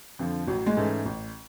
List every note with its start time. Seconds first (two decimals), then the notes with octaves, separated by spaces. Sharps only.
0.19 F2 D3 F3
0.47 A1 F#3
0.66 G#3
0.77 G#2 E3 A3 C#4
1.05 A1